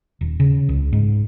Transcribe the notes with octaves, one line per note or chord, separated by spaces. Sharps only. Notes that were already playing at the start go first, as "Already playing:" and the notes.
D#1
C#3
C#2
G#2